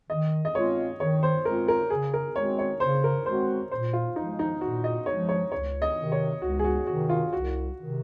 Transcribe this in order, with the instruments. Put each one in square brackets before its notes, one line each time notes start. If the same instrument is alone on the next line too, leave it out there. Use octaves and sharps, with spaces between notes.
[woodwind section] D#3 [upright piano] D#5
[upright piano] D#5
[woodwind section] G#3 C4 F4 [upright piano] C#5
[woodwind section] D#3 [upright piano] C#5
[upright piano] C5
[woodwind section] G#3 C4 F4 [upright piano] A#4
[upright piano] A#4
[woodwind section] C#3 [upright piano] G#4
[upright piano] A#4
[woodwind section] G#3 C4 F#4 [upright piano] C#5
[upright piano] C#5
[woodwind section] C#3 [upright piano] C5
[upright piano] A#4
[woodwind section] G#3 C4 F#4 [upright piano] C5
[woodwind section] A#2 [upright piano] C5
[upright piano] F4
[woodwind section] F3 G#3 [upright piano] D#4
[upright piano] D#4
[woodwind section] A#2 [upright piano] F#4
[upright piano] D#5
[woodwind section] F3 G#3 [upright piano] C#5
[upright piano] C#5
[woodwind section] C#2 [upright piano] C#5
[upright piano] D#5
[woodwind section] C3 D#3
[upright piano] C#5
[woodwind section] C#2 [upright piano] F#4
[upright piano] G#4
F#4
[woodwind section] C3 D#3 [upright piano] F#4
[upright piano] F4
[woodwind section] C2 [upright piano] F#4
[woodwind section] C3 D#3